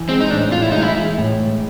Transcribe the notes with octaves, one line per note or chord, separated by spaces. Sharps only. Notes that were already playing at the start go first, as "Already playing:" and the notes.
Already playing: E3
G#3 C4
D#4
A2 D4
A2 F4
E4
E3 D#4
E4
G#3
A2
A2